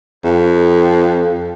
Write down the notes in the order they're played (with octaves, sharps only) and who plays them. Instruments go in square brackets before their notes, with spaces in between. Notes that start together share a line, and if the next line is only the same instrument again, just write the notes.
[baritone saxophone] F2